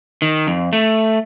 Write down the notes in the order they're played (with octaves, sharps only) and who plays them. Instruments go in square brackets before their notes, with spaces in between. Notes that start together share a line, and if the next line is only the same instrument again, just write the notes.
[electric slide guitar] D#3
F2
A3